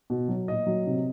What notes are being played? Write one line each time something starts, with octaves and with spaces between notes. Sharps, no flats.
B2
F#3
A#2 D#5
F#3
C3